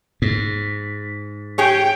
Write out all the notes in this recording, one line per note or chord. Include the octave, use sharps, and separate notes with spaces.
G#2
G4 G#4 C#5 G5